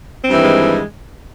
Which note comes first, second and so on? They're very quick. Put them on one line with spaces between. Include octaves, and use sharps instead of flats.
C4 G2 E3 D#3 G#3